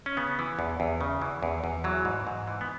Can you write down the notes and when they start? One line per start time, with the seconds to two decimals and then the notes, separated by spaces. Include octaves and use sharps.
0.06 C#4
0.17 C#3 B3
0.39 E3
0.59 E2
0.80 E2
1.01 C#3
1.22 E3
1.43 E2
1.64 E2
1.84 E3 F#3
2.05 G#2
2.27 G#2
2.47 E3
2.61 B3